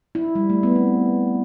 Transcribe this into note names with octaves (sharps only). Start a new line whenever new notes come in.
E4
G3
A3
B3
C4